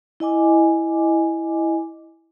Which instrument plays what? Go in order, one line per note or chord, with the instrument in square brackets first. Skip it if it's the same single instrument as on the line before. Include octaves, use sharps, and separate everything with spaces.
[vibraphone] E4 D#5 G#5 D6